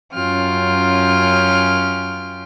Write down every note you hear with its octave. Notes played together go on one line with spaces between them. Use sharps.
F#2 C#4 F4 G5 F6